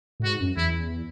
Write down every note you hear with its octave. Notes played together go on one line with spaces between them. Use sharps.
A2
G#2 F#4
F#2
E2 E4